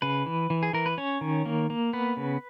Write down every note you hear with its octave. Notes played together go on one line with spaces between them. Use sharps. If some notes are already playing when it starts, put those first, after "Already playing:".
C#3 B4
E3
E3
G#4
E3 A#4
B4
C#4 C#5
D#3
A#3
A#3
B3 B4
C#3